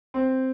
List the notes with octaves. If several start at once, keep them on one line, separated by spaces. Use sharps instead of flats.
C4 C5